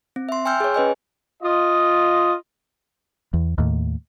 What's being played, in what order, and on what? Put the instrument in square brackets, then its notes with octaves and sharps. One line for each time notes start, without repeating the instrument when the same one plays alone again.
[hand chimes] C4
E5 C6
G5 G#5 C6 E6 F6 G6
G#4 C#5
C#4 B4 D#5 G#5
[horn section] F4 D#5
[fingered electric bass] E2
D#2 A2